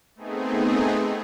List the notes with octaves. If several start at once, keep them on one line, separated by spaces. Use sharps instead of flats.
A3 B3 C4 D#4 G#4